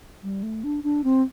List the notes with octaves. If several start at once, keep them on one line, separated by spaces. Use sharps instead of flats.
G3
A3
D4
D4
C4